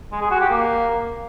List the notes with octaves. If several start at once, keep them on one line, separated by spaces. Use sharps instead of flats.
G#3
G#4
F#4
G4
A#3